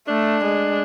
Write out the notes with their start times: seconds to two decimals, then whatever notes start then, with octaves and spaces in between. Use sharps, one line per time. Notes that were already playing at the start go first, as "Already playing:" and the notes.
0.08 A3 D4
0.44 G#3